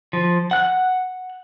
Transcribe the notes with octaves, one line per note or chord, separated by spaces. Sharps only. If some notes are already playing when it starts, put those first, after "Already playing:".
F3
F#5 F#6